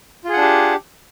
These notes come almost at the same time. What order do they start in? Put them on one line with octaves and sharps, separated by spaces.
F4 G#4 F#5 D4 G4